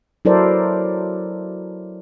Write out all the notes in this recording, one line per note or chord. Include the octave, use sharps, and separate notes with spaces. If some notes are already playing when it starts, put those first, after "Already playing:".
F#3 E4 A4 A#4 C5 D5